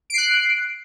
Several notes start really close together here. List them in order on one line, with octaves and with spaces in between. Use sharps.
D7 C7 F#6